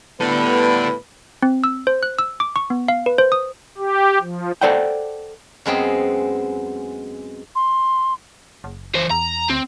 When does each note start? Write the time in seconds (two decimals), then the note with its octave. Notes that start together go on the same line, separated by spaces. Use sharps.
0.21 A2 D3 G3 B3 D4 A4 B4
1.43 C4
1.64 E6
1.87 C5
2.03 F#6
2.19 E6
2.40 D6
2.56 C#6
2.70 B3
2.88 F5
3.06 B4
3.18 C5
3.32 D#6
3.78 G4
4.20 F3
4.61 A4 C5 D5 F#5 G5
5.66 F#2 G#3 B3 C4 C#5 D#5
7.55 C6
8.64 F#1
8.95 E3 C5
9.11 E2 A#5
9.50 D2 C4